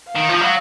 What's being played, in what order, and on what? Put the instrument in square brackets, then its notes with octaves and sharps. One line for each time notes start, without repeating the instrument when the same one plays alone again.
[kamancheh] F5
[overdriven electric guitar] D#3
F3
F#3